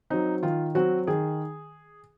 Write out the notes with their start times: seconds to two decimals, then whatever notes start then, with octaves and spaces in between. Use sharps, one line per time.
0.10 F#3 C4 D#4
0.43 D#3 F4
0.75 F#3 C4 F#4
1.07 D#3 G#4